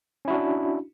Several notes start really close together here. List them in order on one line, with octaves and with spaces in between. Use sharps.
C#4 E4 F#4 D4